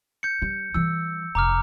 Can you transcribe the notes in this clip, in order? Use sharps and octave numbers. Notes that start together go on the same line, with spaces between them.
G6 C#7
G3
E3 G3 E6
F1 A#5 D6 F6